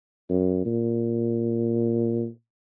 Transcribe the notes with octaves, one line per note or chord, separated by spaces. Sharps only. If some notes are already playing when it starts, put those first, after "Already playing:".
F#2
A#2